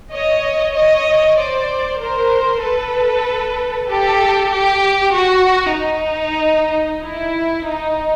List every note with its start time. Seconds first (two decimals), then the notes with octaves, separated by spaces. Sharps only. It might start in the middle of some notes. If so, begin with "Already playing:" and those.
0.12 C#5 D#5
0.75 C#5 D#5
1.38 C5 D5
2.01 A#4 C5
2.64 A4 B4
3.89 G4 A4
4.52 G4
5.16 F#4
5.78 D#4
7.04 E4
7.67 D#4